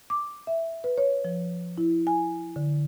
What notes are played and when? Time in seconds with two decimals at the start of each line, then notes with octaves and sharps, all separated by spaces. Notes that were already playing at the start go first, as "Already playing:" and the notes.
0.10 D6
0.47 E5
0.84 B4
0.98 C#5
1.25 F3
1.78 E4
2.07 G#5
2.56 D3